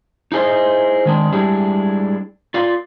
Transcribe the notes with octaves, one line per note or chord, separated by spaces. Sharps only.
D#4 E4 G#4 C5 D#5
D#3 G#3 D4
G3 G#3 D4 E4 G#4
F4 D5 F5